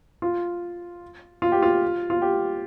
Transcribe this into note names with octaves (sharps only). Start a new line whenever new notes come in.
F4
F4
G4
F4
F4
G4